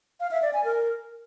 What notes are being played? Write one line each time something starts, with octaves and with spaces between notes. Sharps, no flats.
F5
E5
D5
G#5
A#4